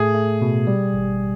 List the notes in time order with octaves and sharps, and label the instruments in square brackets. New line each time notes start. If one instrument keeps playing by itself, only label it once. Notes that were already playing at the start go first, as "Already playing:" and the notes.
Already playing: [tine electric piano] A2 A3 [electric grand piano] G#4
[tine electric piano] A3
B2
G3
G#1